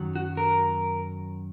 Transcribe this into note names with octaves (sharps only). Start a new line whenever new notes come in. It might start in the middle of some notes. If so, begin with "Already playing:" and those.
Already playing: F#2 D#3 F#3
F#4
A#4